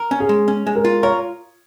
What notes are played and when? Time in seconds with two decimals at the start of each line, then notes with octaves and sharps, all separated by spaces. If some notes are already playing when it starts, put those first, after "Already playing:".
Already playing: A#4
0.11 C#4
0.20 G#4
0.29 G#3
0.48 C#4
0.67 G#3
0.75 A#4
0.85 F4
1.03 A#4 C#5